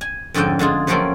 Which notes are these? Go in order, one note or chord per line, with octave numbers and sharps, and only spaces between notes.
G#5
F2 G#2 D3 C#4 G5
D3 G#3 F4 G#4
F3 F#3 A3 A#3 C4 C#4